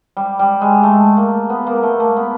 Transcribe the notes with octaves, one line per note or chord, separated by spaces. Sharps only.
G3
G3
G#3
A3
A#3
B3
A#3
A3
A#3
B3